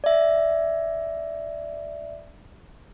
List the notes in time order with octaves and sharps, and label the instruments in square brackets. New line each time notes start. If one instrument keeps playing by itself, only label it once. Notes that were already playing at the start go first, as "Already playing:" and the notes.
[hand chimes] D5 E5